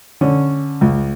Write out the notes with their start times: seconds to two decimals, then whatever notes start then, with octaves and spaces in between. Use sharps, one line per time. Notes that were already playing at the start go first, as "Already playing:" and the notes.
0.21 D3 C#4
0.81 C#2